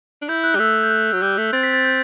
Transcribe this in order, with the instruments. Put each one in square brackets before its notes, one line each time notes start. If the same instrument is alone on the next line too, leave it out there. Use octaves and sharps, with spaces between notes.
[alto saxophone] D4
[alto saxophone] E4 [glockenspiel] G6
[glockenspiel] F#6
[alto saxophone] G3
[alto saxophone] A3 [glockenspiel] E6
[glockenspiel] G6
F#6
[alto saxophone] F#3
[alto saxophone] G3 [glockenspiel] G6
[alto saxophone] A3
[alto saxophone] C4 [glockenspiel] A6
[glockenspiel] B6
A6
G6